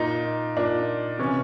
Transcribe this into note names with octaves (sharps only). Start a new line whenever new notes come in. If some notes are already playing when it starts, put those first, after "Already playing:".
Already playing: A#2 D#4
A#2 D4
C3 E3 C#4